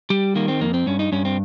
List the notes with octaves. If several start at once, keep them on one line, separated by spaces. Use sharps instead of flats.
G3 G4
D#3 A#3
C4
F2 A#3
C4
G2 C#4
D#4
G2 C#4
C4